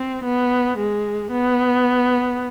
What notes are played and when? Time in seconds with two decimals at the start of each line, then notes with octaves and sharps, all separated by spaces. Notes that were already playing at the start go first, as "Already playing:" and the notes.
Already playing: C4
0.24 B3
0.78 G#3
1.31 B3